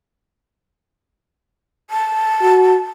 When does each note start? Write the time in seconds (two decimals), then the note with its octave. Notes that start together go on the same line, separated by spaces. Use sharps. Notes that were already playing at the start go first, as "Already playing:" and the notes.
1.90 A5
2.41 F#4